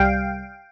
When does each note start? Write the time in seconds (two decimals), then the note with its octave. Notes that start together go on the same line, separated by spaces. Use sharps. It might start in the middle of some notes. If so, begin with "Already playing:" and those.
Already playing: C2 G3 F5 G5